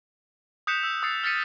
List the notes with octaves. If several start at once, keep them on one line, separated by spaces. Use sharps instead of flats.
D#6 F#6 G6 B6 C#7 E7
E6
D#6 E6 A6 C7 C#7
F6 A6 B6 C#7 D#7